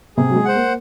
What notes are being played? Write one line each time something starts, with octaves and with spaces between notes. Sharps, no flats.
C3 G#4
F#3
G#3
C5 F#5
A#3